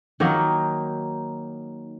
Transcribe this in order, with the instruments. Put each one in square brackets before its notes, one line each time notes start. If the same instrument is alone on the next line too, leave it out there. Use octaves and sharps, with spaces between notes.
[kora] D#3 F#3 A#3 D#4